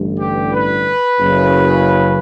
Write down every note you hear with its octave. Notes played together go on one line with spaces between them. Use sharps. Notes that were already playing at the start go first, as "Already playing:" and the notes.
Already playing: A1 G2 D3
G4
B4
F#1 F#2 C#3